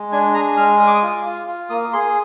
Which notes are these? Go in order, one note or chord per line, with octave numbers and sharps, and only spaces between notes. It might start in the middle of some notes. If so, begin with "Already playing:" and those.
Already playing: G#3
D4 G#5
G#4 A#5
G#3 F6
G#4 D#6
D6
D#6
F4
F4
F4
A#3 D#6
G#4 C6